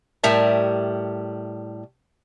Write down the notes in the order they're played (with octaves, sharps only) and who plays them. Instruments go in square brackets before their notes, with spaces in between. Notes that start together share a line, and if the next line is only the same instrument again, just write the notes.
[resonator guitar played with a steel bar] A2 G3 A#4 E5 A5